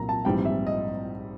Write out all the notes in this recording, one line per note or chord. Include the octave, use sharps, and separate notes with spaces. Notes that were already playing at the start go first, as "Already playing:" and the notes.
Already playing: C2 A#2 F#3 A#3 A#5
A5
A#1 G#2 E3 G3 C4 G5
E5
D#5